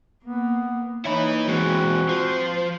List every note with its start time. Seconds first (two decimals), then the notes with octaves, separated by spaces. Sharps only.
0.24 A#3 B3
1.05 A#3 D#4 E4 B4 C#5
1.48 E3 G#3 C4 F#4
2.09 F3 C5